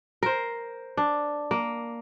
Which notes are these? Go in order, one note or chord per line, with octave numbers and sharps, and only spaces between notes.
A#4 C5
D4
A#3